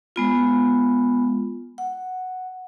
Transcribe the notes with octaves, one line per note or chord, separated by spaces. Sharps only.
G#3 B3 F4
F#5